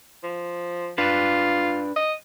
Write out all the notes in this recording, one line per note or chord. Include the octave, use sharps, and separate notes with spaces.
F3
D4 F4 B4
D#5